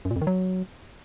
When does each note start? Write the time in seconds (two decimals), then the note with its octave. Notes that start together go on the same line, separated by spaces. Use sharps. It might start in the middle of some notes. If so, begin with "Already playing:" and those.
0.05 F#2
0.11 A#2
0.16 F2
0.21 D#3
0.27 F#3